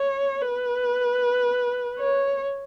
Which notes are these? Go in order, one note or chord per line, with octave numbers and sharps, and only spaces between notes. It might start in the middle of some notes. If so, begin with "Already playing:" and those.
Already playing: C#5
B4
C#5